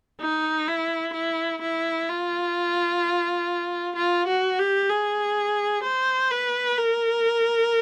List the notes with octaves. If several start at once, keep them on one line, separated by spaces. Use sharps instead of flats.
D#4
E4
E4
E4
F4
F4
F#4
G4
G#4
C5
B4
A#4